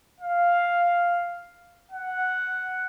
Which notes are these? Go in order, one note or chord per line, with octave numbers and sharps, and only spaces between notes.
F5
F#5